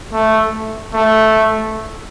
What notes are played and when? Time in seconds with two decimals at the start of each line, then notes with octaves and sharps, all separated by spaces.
0.12 A3
0.94 A3